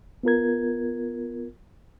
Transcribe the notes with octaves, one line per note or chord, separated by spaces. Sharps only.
B3 F4 A#4 G#6